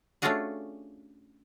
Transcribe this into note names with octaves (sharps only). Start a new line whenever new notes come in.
A3 C#4 D4 F4 F#4 G#4